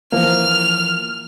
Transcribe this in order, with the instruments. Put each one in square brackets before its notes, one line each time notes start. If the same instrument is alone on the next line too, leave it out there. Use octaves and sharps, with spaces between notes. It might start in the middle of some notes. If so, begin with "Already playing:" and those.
[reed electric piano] E3 F3 A#3 [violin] F6